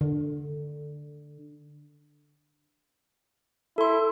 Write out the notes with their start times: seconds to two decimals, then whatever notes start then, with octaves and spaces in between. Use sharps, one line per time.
0.01 D3
3.78 E4 A4 C6